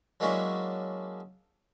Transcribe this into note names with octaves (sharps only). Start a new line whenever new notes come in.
F#3 G#3 A#3 C#4 D4 E4